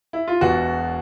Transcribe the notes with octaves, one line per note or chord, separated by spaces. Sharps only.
E4
F4
E1 E2 B2 F#4